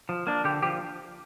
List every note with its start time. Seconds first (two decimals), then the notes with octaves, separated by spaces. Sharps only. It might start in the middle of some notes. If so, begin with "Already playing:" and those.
0.09 F3
0.27 A#3 D4
0.44 D3 G4
0.63 F3 G4